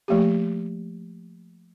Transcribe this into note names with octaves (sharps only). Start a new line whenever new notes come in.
F3 A3 A#3 G4